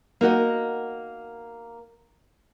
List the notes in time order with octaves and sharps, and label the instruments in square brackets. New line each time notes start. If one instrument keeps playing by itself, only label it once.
[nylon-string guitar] A#3 D#4 F#4 D#5